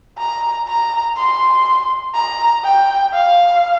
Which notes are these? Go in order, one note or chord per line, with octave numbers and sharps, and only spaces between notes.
A#5
A#5
C6
A#5
G5
F5